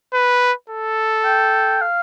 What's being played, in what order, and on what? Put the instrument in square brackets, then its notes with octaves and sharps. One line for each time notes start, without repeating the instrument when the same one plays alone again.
[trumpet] B4
A4
[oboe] G5
F5